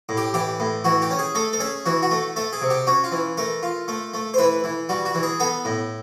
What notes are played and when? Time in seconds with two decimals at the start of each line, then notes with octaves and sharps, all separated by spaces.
0.09 A2
0.17 G4
0.34 E3 G4
0.60 A2
0.84 E3 F#4
1.02 G4
1.10 C#4
1.19 G#4
1.35 A3 A4
1.53 A4
1.60 C#4 G#4
1.86 E3 F#4
2.02 F#4
2.11 A3
2.36 A3 A4
2.53 G#4
2.62 C3
2.70 G4
2.87 C#4 F#4
3.04 F4
3.12 E3
3.37 A3 A#4
3.63 F4
3.88 A3
4.14 A3
4.34 C5
4.38 E3 B4
4.64 E3
4.89 G3 F#4
5.05 F#4
5.15 E3
5.23 G#4
5.40 B3 A4
5.65 A2